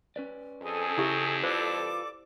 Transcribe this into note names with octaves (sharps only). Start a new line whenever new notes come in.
C#4 B4 D5
F2 G#4 A4 G#5
C#3 E4 G4 E5
F4 A4 B4 C5 D5 D6